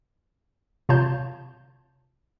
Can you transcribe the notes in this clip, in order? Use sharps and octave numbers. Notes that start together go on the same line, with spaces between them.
C3 F4 C#5 A5 G6